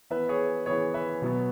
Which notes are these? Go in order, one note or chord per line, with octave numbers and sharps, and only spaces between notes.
E3 B3 B4 E5
G#4 C#5
E3 B3 G#4 C#5
B4 E5
B2 F#3 B3